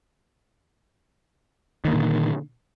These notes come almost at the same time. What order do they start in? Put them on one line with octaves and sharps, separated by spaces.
D#3 A#3 D3 A#2